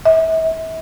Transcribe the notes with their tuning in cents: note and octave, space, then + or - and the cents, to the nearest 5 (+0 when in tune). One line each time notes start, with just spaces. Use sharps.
E5 -35